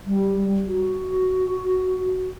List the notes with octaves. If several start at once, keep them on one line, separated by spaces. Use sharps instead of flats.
G3
F#4